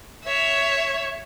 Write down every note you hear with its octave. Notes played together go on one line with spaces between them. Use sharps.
C#5 E5